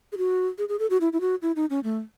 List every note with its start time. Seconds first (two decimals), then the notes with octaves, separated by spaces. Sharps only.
0.12 G#4
0.18 F#4
0.58 G#4
0.69 G#4
0.79 A4
0.90 F#4
1.01 E4
1.13 E4
1.21 F#4
1.42 E4
1.56 D#4
1.70 C#4
1.84 A3